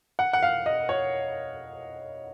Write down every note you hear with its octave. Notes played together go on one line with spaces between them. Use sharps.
F#5
F#5
F5
D#5
C#5